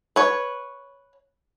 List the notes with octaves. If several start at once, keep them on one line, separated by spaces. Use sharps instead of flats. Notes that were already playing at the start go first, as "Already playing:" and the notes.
B4 C#5